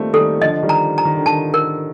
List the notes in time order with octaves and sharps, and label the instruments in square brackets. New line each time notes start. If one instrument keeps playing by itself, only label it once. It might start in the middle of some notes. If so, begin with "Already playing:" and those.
Already playing: [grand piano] D#3 F3 G3 A3 A#3 C4
[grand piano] D#3 G3 [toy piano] A4
[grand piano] D3 F3 [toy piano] D#5
[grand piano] D#3 G3
[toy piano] A#5
A#5
[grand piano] D#3
D3
[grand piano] D#3 [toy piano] A5
[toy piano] A#4